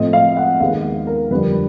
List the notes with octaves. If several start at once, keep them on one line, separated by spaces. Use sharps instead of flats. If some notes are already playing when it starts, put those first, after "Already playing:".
Already playing: A2 F3 A3 C4 D#5
F5
F#5
D#2 D#3 G#3 B3 F5
A#4
F2 D3 G3 B4